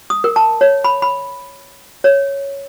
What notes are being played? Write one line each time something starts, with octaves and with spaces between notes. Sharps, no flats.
D#6
A#4
A5
C#5
B5
B5
C#5